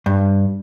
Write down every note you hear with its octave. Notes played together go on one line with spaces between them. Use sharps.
G2